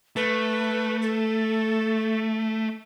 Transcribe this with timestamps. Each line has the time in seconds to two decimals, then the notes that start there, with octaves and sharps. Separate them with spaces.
0.16 A3 B4
1.02 A4